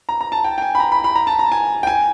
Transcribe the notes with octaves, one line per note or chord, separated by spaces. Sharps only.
A#5
A#5
A5
G5
G5
G#5
B5
A#5
B5
B5
A#5
A5
A#5
G#5
G5
G#5